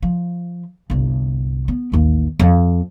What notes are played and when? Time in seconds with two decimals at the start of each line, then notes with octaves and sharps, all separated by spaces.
0.02 F3
0.90 G1 C2
1.68 B3
1.92 A1 D#2
2.39 F2